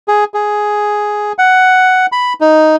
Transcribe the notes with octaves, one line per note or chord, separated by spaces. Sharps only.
G#4
G#4
F#5
B5
D#4